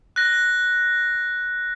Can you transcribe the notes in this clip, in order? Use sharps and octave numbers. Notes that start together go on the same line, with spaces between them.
F#6 A#6